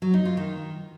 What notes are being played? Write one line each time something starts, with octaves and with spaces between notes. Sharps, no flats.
F#3
D#4
F4
D#3